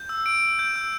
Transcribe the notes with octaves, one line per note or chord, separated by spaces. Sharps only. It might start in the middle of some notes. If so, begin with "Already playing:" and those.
Already playing: G6
E6
D7
E6
G6
E6